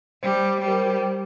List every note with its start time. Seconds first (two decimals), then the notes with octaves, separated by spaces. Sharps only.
0.23 G3 C5
0.61 G3 C5
0.68 A#4
0.75 C5
0.86 G4